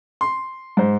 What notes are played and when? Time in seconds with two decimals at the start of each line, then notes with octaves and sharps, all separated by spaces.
0.21 C6
0.77 G#2 C5